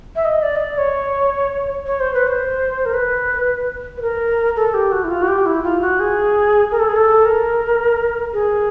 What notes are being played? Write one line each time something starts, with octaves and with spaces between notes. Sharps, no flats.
E5
D#5
D5
D#5
D5
C#5
C#5
C5
B4
C5
A#4
B4
B4
A#4
A4
G4
F#4
E4
F4
F#4
G4
E4
F4
F#4
G#4
A#4
A4
G#4
A4
A#4
G#4